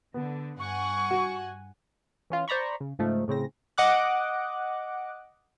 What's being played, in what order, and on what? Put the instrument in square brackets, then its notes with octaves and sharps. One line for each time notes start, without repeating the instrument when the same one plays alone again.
[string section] D3 [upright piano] B3
[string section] G2 F#5 G#5 [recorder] C#6
[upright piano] F#4
[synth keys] E3 C#4 F4
C5 D5 A#5 B5 C#6
C#3
G#2 C#3 F3 A3 D#4
A2 C#3 C4 A#6
D#5 F#5 D6 F#6